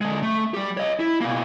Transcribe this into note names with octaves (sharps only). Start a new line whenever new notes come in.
D3 G#3
A3
G3 G4
C#5 D#5
E4
B2 A#3